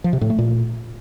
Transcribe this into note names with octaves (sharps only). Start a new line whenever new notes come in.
F3
C3
A2
A3
A#2